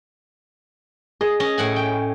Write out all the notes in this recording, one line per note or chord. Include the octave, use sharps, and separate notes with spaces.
G#4 D#5
C#4 D#5
A2 F#5 G#5
G5